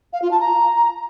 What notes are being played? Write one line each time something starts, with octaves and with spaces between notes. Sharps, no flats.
F5
F4
A5
A#5